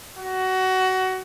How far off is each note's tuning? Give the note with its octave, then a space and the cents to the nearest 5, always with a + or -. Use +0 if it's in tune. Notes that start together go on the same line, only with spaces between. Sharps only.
F#4 +20